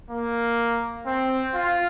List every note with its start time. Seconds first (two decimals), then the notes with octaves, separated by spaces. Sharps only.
0.10 A#3
1.06 C4
1.54 F4